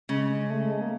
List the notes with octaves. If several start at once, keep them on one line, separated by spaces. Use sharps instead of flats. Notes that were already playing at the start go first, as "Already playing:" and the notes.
C#3 G#3
G#3
A3
G#3
A#3